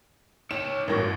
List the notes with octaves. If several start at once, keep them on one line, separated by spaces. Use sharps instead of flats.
D#4 C#5 E7
A1 G2 F#4 A#4 C#5